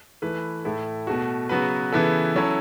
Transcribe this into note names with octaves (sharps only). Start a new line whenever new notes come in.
E3 A3 E4 B4
A2 A3 E4 A4
B2 A3 F#4
C#3 F#3 B3 F#4 B4
C#3 E3 B3 E4 A4
F#3 C#4 E4 A4